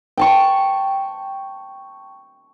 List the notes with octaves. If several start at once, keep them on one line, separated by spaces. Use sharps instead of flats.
G5 A5 C#6